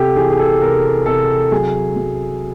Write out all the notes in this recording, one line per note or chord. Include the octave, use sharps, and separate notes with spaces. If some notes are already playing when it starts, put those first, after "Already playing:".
Already playing: C3 G4 A4
E3 G#4
G#4
A4
C3 A#4
C3 A4
F#3 G#4
F#3